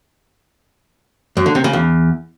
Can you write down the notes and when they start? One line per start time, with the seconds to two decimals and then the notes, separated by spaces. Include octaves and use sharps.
1.37 F#2
1.46 D3
1.55 C3
1.64 C#3
1.73 E2